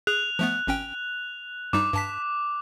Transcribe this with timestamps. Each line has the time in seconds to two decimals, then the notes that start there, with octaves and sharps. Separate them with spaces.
0.07 G#4 F#6 F7
0.39 F3 A3 B3
0.67 G#1 C#4 G5
1.73 G2 G3 D#4 D6
1.94 G2 A5 B6